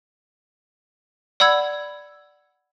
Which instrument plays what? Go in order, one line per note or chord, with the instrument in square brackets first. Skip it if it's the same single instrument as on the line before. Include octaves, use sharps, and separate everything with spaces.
[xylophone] D5 F#5 B5 E6 G#6